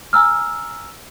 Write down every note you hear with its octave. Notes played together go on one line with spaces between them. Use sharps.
G#5 A#5 E6 F6